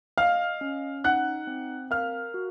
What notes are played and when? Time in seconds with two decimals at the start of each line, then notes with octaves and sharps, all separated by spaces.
0.18 D#5 F5 F6
0.61 C#4
1.04 D#4 F#5 F#6
1.47 C4
1.91 A#4 F5 F6
2.34 F#4